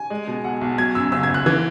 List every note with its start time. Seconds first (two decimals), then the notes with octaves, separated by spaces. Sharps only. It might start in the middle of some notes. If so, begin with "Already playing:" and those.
Already playing: G#5
0.10 G#3
0.27 B2
0.44 B1 F#5
0.61 B1
0.78 F#3 G#6
0.95 F#2 E6
1.12 F#1 E6
1.23 G#6
1.29 F#1
1.34 F#6
1.46 E3 G#6